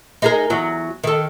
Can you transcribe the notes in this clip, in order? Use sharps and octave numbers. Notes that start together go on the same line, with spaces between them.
D#4 G#4 A#4
E2 F#3 F#4
D#3 A4